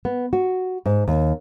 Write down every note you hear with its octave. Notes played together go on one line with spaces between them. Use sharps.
B3
F#4
G#2
D#2